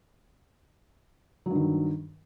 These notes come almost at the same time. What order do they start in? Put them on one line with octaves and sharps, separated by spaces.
F#3 G2 D#3